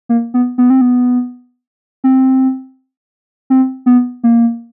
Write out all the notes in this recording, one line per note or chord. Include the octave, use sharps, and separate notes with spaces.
A#3
B3
B3
C4
B3
C4
C4
B3
A#3